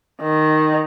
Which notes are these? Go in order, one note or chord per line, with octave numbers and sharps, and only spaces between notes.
D#3